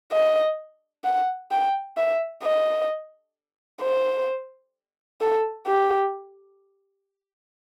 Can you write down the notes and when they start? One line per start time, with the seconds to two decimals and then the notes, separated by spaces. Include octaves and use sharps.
0.12 D#5
1.05 F#5
1.51 G5
1.97 E5
2.43 D#5
3.82 C5
5.21 A4
5.67 G4